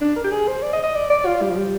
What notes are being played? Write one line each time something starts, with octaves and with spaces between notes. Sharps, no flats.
D4
A#4
G4
G#4
C5
D5
D#5
D#5
D5
D5
F4
G3
F3
G3